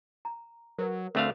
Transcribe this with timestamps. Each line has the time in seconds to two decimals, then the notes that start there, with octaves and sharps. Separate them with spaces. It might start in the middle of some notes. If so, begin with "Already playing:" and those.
0.25 A#5
0.78 F#3 A#4 B4
1.15 D2 A3 C4 A4 B4 F5 B5